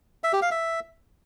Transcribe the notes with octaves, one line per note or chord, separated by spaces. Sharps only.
E5
G4
F5
E5